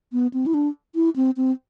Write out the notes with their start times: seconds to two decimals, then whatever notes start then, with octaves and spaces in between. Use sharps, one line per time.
0.12 B3
0.34 C4
0.46 E4
0.54 D4
0.95 E4
1.16 C4
1.37 C4